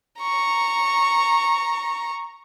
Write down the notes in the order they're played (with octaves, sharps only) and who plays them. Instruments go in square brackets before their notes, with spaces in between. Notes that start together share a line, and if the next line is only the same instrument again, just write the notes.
[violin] A#5 C#6